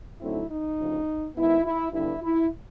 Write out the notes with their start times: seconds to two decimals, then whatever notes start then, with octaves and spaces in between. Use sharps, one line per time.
0.21 D3 F#3 A3 C4 D#4 E4
0.50 D#4
0.78 D2 C#3 F3
1.36 G#2 D#3 G#3 B3 E4
1.65 E4
1.93 G2 D3 G3 B3 E4
2.22 E4